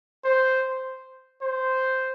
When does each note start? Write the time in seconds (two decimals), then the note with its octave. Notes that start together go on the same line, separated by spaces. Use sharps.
0.25 C5
1.42 C5